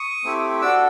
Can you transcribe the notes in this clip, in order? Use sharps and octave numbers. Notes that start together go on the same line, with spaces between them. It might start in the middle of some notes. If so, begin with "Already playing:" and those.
Already playing: C#6 D#6
A3 C4 E4 G4
D4 F#4 A4 D6 E6